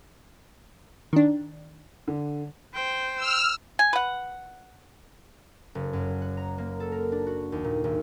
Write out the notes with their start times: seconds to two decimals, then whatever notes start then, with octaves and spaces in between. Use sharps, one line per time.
1.13 D#3 D4
2.08 D3
2.74 C5 G5
3.16 E6 F6
3.79 G#5
3.93 B4 F#5
5.75 F#1
5.93 F#2
6.22 F#5
6.37 A#5
6.58 A#3
6.80 A4
6.92 A#4
7.12 D4
7.26 F#4
7.52 D#2
7.64 A#2
7.84 G#1